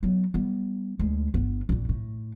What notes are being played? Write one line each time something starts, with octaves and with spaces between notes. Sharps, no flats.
F#3 B3
G3 B3
D2 G#3
G1 B3
A#1 F2
A2